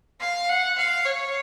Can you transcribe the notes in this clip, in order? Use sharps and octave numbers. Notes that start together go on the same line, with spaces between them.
F5
F#5
F5
C#5